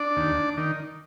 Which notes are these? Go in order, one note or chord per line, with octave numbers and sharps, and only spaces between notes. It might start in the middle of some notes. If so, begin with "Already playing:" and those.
Already playing: D4 D5
D#2
D#3